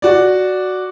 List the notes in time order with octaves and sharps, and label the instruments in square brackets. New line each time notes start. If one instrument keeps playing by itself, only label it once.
[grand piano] F#4 D5